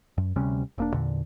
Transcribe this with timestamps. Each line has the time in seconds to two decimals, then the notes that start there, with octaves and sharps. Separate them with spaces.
0.18 F#2
0.36 D2 C3 G3 C#4
0.78 E1 A#3 D4
0.94 E2 A#2 D3